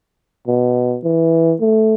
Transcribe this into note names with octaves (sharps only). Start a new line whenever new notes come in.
B2
E3
A3